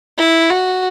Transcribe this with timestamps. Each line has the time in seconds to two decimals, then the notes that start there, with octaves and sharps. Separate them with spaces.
0.18 E4
0.50 F#4